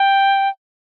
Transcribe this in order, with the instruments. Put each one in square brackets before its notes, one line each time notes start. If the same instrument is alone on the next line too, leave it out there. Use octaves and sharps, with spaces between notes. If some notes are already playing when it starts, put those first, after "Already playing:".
Already playing: [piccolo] G5